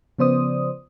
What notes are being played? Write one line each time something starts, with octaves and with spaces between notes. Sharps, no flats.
C#3 F3 B3 C5 D5 D#6